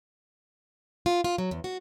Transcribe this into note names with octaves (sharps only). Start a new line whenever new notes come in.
F4
F4
F#3
E2
F#4